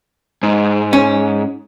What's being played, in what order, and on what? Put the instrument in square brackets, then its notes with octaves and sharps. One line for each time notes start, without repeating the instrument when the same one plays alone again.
[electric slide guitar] G#2
[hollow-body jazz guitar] C#4